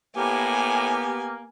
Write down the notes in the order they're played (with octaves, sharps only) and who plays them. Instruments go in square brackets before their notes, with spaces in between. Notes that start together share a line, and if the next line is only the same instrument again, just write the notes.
[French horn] A2 [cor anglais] A#3 [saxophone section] B3 G4 [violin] G#5